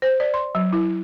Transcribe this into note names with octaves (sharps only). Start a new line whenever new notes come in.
C5
D5
C6
F#3
E4